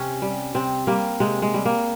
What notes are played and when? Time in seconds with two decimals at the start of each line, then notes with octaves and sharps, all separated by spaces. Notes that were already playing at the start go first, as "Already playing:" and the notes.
Already playing: C3 C#4
0.22 G3
0.55 C3 C4
0.87 G3 A#3
1.20 C3 G#3
1.42 G#3
1.54 G3
1.66 A#3